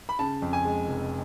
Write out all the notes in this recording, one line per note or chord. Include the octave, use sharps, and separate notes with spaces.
B5
C#3 A5
F2
G#5
G#3
F1